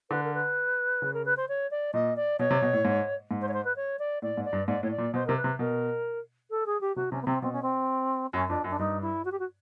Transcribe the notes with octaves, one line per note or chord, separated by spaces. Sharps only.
D3 B4
A#4
B4
C#3
A#4
B4
C5
C#5
D5
A#2 D#5
D5
B2 C#5
C3
B2
A2
G#2
G#2
C5
C#5
C5
B4
C#5
D5
A2 D5
G#2
D5
G2
G#2 D5
A2 C#5
D5
A#2
B2 C5
C3 A#4
B4
C3
B2 A#4
A4
G#4
G4
C3 F#4
C3 C#4
B3
C3 C4
B2 C4
C#4
C4
F#2 C#4
F2 D4
F#2
D4
G2 D#4
E4
F#4
G4
F#4